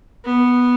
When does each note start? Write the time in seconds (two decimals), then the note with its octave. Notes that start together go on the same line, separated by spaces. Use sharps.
0.25 B3